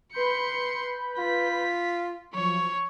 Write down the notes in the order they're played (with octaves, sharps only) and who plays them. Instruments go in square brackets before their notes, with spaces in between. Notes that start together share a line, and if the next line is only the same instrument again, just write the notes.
[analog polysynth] B4 B5 G6 [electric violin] C6 C#7
[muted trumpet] F4 [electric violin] B6
[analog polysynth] F3 F#3 [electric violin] C#5 C#6